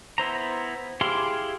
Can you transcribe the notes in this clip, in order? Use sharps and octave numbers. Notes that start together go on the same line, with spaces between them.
B3 E4 C5 A#5
E4 G4 G#4 F5 C6